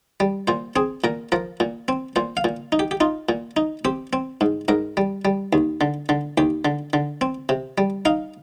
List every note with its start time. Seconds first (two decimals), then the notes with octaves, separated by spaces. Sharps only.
0.20 G3
0.47 A#2 C5
0.76 C4 G#4
1.04 A#2 A#4
1.32 F3 A#4
1.60 A#2
1.88 C4
2.16 A#2 C5
2.37 F5
2.44 A#2
2.72 D#4
2.79 G4
2.91 G4
3.00 D#4 F4
3.29 A#2
3.57 D#4
3.85 C4 G4
4.13 C4
4.41 G#2
4.68 G#2 A#4
4.97 G3
5.25 G3
5.53 D#2
5.81 D3
6.09 D3
6.38 D#2 G4
6.65 D3
6.93 D3
7.21 C4
7.49 C3
7.78 G3
8.05 D#4 F5